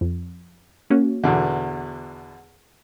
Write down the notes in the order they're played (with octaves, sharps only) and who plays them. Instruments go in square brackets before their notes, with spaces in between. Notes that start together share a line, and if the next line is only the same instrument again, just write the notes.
[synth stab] F2
A#3 C#4 F#4
[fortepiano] E2 B2 D3